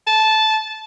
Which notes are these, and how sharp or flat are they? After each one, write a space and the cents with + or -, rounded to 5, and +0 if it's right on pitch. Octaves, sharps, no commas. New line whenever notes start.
A5 -10